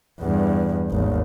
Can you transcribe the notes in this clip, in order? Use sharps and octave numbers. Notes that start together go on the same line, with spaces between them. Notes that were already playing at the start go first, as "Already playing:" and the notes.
E2 G2
G#1 D#2